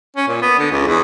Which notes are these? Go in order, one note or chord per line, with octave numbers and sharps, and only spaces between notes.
C#4
A#2
B3
D3
C#2
E2